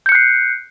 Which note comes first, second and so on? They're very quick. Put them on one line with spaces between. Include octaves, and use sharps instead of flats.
G6 C#7 F#6 C7